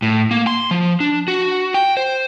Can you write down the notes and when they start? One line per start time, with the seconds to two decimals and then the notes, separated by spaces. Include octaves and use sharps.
0.02 A2
0.31 A#3
0.47 C6
0.71 F3
1.00 D4
1.28 F#4
1.74 G5
1.97 C5